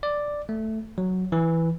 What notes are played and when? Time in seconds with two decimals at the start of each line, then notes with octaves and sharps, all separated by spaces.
0.03 D5
0.49 A3
0.98 F#3
1.32 E3